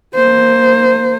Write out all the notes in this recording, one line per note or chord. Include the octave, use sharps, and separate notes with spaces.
A#3 C5